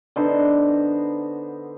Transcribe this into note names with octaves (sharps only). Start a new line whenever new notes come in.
D3 B3 D#4 C5